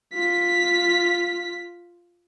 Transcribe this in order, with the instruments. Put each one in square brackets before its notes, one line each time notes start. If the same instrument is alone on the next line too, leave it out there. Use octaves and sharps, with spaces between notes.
[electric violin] F4 B6